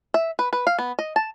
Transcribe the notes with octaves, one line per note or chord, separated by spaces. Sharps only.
E5
B4
B4
F5
B3
D#5
A5